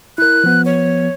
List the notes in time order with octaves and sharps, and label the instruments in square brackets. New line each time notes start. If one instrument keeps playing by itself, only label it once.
[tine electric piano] E4 A#4 [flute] F#6
[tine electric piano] F3 B3
[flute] C#5